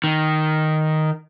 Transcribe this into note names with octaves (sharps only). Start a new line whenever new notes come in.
D#3